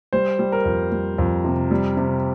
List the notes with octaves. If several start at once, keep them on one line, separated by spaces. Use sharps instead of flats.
G3 C5
G3
A#4
F2
G3
F2
C3
G3
C3